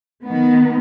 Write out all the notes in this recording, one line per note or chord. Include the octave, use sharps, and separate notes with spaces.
D#3 B3